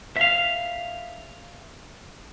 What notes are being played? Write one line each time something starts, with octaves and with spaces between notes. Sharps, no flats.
E5 F5